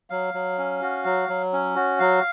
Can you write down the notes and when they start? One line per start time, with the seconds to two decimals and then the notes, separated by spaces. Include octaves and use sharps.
0.10 F#3 F5
0.34 F#3
0.58 C#4
0.82 F#4
1.05 F#3
1.29 F#3
1.53 C#4
1.76 F#4
1.99 F#3 F5